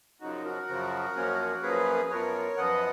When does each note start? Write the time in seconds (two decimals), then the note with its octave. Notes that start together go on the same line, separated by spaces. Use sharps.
0.21 F#2 C#3 F3 D#4 F#4
0.45 F#4 A#4
0.69 F#2 C#3 F3
1.15 F#2 F3 A#3 C#4
1.63 F#2 F3 A#3 C#4 G#4 B4
2.10 F#2 F3 B3 A#4 C#5
2.57 F#2 F3 B3 D#5 F#5